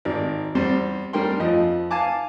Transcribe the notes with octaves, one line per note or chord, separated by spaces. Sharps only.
G#1 D#3 D5
E2 G3 C5
G3 D4 A#4 G5 C6
F2 F3 D#5
F5 G#5 A5 D6